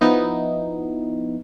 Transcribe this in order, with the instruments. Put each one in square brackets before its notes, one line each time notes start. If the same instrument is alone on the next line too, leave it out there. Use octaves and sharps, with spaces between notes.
[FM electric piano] F3 B3 D#4 E4